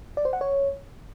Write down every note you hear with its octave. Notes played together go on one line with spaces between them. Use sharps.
D5
C5
F#5
C#5